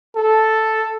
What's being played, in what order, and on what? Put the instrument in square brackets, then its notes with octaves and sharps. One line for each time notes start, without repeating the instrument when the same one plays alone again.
[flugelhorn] A4